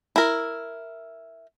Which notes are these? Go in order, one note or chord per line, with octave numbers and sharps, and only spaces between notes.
E4 A#4